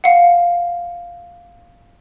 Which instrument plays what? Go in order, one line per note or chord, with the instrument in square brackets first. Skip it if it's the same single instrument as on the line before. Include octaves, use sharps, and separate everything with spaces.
[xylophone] F5 F#5